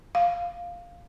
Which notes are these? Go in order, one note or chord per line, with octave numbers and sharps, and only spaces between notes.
F5